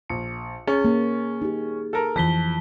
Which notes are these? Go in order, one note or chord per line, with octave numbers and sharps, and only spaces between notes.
A#1 C#7
C#4 G#4
A#3
D#4 G4
A4 A#4
F2 E3 F3 A5 B6 G7